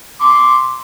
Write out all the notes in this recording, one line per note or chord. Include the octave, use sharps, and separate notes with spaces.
C6 D6